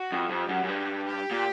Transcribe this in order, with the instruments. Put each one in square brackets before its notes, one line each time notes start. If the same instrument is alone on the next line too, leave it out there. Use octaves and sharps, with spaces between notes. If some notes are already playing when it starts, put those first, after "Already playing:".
Already playing: [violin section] F#4
[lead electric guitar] F2
[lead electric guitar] F2 [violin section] G4
[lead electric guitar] F#2
F#2
G2
[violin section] G4
[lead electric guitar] A#2